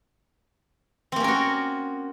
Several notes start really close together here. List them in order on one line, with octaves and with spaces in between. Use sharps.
C4 A#3 C#4 A#4 F#4